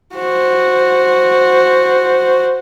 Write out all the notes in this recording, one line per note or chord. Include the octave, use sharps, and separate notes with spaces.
F#4 C5